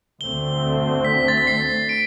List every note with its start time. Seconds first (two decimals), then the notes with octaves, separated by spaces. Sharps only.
0.21 D2 D3 A3 C4 G7
1.05 B6
1.28 A6
1.37 B6
1.47 C7
1.89 D7